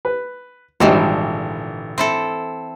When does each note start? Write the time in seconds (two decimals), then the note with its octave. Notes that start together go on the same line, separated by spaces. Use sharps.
0.05 B4
0.80 G#1 A#2 D3 E3 G3 D#4
1.98 C4 E4 A4